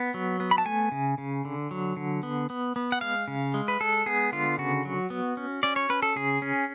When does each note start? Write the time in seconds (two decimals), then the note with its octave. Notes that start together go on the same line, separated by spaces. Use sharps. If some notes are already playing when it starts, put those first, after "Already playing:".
Already playing: B3
0.14 F#3
0.40 B3
0.51 B5
0.58 A5
0.65 A3 G#5
0.92 C#3
1.18 C#3
1.45 D3
1.71 F#3
1.97 D3
2.23 B3
2.50 B3
2.76 B3
2.92 F#5
3.01 G#3 F5
3.28 C#3
3.54 G#3
3.68 B4
3.80 G#3 A4
4.06 B3 G#4
4.32 D3 F4
4.58 C#3 F#4
4.85 F#3
5.10 B3
5.37 C#4
5.63 C#4 D5
5.76 C#5
5.90 C#4 B4
6.02 A4
6.16 C#3 G#4
6.42 C#4